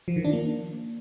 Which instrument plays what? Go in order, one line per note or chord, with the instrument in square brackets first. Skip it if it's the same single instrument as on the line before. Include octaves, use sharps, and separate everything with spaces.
[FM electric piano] F3
D#3
D4
A#3